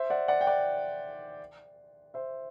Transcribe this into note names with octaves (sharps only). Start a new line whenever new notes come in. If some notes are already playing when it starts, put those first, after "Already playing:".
Already playing: C5 E5
D5 F#5
D5 F#5
G5
D5 F#5
C5 E5